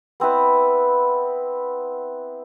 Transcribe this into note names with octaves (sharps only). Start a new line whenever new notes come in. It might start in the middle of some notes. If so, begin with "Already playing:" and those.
B3 C4 E4 B4